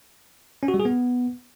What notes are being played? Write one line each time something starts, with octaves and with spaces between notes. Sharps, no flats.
C#4
F#4
G3
G#4
B3